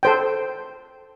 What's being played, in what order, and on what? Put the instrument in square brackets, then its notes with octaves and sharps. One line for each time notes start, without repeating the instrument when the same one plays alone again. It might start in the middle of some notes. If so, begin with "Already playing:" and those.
[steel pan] A4 C5 G5